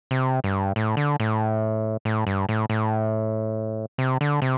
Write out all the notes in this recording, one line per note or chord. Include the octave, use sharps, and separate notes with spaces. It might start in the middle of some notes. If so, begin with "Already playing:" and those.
C3
G2
A2
D3
A2
A2
G2
A2
A2
C3
D3
C3